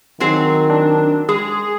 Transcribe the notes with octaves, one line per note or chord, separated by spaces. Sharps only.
D#3 F#3 C4 G#4
D4
G#3 G#4